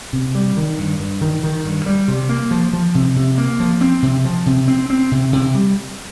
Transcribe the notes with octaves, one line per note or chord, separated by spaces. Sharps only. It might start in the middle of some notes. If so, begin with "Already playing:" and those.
C3
G3
D#3
G2
G2
D#3
D#3
G2
G3
C3
A#3
F3
F3
C3
C3
A#3
F3
C4
C3
F3
C3
C4
C4
C3
C3
G3